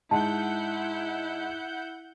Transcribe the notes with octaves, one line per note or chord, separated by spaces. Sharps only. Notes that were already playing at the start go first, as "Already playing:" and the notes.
G#2 E4 F#5 A5 G6